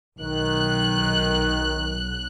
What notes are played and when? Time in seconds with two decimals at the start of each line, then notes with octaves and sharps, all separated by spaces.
0.20 B1 D#3 F#6